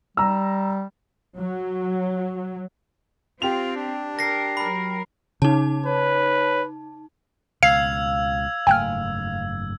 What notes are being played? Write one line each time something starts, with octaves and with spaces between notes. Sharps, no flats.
G3 A#5 E6
F#3
C4 F4 G4 F7
D4
A#4 A#6 C7
F#3 A#4 B5
C#3 D#4 A5
B4 C#5
C#2 B2 F5 E6 G#6 C7
F#1 G#2 A3 G5 G#5 F6